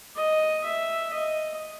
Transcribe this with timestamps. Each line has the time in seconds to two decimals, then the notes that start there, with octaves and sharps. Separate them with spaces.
0.17 D#5
0.64 E5
1.12 D#5